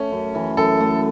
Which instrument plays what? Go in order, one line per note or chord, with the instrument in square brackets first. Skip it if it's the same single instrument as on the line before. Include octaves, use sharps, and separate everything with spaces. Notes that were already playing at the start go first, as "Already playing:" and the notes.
Already playing: [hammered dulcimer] A3 [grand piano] C#4
[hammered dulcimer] F#2
E3
[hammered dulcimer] F#2 [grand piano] A4
[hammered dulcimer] A3